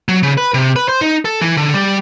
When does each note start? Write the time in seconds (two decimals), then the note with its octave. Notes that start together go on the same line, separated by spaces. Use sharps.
0.09 F#3
0.23 C#3
0.37 B4
0.54 C3
0.76 B4
0.89 C5
1.01 D#4
1.25 A4
1.41 E3
1.57 D3
1.74 G3